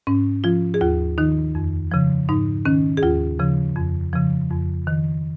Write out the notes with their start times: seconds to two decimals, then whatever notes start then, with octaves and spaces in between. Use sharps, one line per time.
0.07 G#2 C#4
0.44 F3 F4
0.74 G#4
0.81 D#2 F4
1.18 D#3 D#4
1.55 F2
1.92 C#3 F3
2.29 G#2 D#4
2.65 D#3 C#4
2.97 G#4
3.03 D#2 F4
3.39 C#3 F3
3.76 F2
4.13 C#3 F3
4.50 F2
4.87 D#3